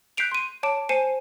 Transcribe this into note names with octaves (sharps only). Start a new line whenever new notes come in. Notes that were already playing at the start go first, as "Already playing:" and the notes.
F#6 G6 B6 C7 D7 F7
C6 D#7
C#5 A5 D6 D7 E7
C5 G#5 C7 C#7 D#7 E7